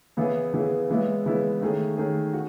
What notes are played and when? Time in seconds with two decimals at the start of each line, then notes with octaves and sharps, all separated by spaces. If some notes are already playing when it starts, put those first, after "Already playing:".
0.17 C#3 E3 B3 E4 G#4
0.53 C#3 E3 B3 E4 G#4
0.90 C#3 E3 G#3 B3 E4
1.26 C#3 E3 G#3 B3 E4
1.61 D#3 A3 C#4 G#4
1.97 D#3 A3 C#4 G#4
2.33 F#4